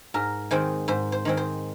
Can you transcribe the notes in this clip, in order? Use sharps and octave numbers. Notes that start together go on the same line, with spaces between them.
G#2 A#4
D#3 G#3 C4 C5
G#2 C5
C5
D#3 G#3 C4
C5